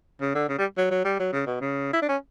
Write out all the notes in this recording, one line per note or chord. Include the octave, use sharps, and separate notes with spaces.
C#3
D3
C#3
G3
F#3
F#3
G3
F#3
C#3
B2
C#3
E4
D4
C#4